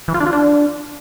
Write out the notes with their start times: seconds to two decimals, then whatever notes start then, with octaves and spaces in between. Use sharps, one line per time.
0.08 E3
0.14 F4
0.20 D4
0.27 F4
0.33 D4